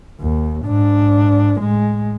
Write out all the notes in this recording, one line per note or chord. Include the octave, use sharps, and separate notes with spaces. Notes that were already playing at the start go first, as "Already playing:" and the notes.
D#2
G#2 D4
A2 G#3